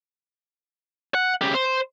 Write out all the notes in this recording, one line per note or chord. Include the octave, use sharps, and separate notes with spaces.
F#5
C#3 G4
C5